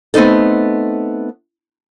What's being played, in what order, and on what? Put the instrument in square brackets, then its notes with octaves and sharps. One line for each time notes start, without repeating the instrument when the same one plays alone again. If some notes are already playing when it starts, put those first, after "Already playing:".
[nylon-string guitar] A3 B3 C4 D#4 A4